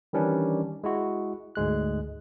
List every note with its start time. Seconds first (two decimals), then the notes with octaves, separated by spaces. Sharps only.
0.13 D#3 E3 G3 C#4 D4
0.84 G#3 E4 F#4
1.55 D2 G#2 G#3 F#6